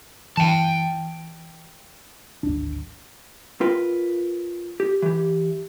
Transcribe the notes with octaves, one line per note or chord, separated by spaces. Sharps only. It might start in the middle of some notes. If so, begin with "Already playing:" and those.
E3 G5 A5
D1 G#1 D4
F4 A#4 B4 G5
G4
E3 G4